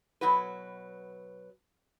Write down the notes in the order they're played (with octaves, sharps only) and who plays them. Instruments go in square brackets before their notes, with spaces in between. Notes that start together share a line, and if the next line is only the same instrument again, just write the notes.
[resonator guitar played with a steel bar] B2 F#3 F#4 B4